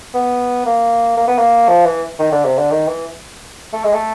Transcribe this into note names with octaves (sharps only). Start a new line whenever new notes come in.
B3
A#3
A#3
B3
A#3
F3
E3
D#3
D3
C3
D3
D#3
E3
A3
G#3
A3